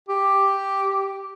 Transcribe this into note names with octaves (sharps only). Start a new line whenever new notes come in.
G4